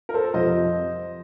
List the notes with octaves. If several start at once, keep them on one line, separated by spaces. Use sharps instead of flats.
A#4
A4 C5
F2 C3 F3 C5 D#5